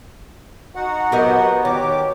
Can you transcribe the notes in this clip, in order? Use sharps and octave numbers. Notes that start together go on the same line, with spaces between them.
D#4 F#4 F#5
B2 F#3 B3 G4 A#4 D#5
B2 D#3 F#4 G4 C#5 D6